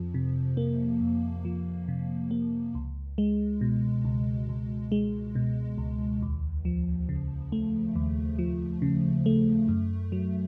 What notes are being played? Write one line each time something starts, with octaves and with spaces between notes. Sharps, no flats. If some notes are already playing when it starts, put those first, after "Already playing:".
Already playing: F2 F3
C3
A#3
F2
F3
C3
A#3
C#2
G#3
B2
C#2
C#2
G#3
B2
C#2
D#2
F3
C#3
A3
D#2
F3
C#3
A3
F#2
F#3